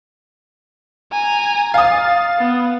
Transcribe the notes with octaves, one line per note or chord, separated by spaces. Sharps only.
G#5 A#5
F5 D#6 A6
B3